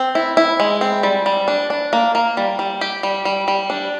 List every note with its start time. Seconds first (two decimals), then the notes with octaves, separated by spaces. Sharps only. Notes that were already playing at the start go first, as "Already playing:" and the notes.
Already playing: C4
0.15 E4
0.37 E4
0.60 G#3
0.81 C4
1.03 G3
1.26 G3
1.48 D4
1.70 D4
1.93 A#3
2.15 A#3
2.37 G3
2.59 G3
2.81 G4
3.03 G3
3.25 G3
3.48 G3
3.70 D4